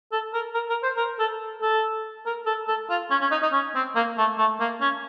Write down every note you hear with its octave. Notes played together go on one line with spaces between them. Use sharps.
A4
A#4
A#4
A#4
C5
A#4
A4
A4
A#4
A4
A4
F4
C#4
C#4
D#4
D#4
C#4
C4
A#3
A3
A3
A#3
C#4